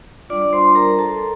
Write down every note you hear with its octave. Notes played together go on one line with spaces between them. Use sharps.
G3 D4 F4 D5 D6
C5 C6
A#4 A#5
A4 A5